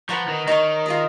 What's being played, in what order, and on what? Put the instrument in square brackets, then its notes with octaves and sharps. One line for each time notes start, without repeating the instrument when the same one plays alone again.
[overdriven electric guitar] F3 [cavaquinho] B4 F#5 A#5 C#6
[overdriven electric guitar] D#3
[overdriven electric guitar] D#3 [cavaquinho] D#4 A#4 C#5
[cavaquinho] F4 G#4 D#5